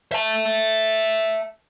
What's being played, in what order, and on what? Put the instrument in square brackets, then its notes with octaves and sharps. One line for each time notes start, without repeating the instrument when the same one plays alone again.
[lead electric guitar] E5 A5